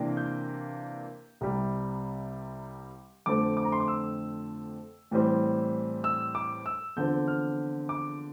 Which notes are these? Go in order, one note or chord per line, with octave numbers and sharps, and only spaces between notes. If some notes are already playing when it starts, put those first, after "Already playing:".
Already playing: C3 E3 A#3 D4
G6
C2 C3 G3
F2 D3 A3 C4 D6
D6
A#5
C6
D6
E6
A2 E3 G3 C4
E6
D6
E6
E2 D3 F3 C4 G6
F6
D6